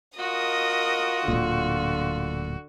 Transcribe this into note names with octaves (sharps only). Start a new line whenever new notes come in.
F4 F#4 A#4 D#5 D#6
D1 G#1 A#2 D3